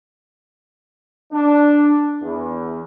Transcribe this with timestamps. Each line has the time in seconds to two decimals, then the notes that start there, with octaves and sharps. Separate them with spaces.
1.32 D4
2.21 E2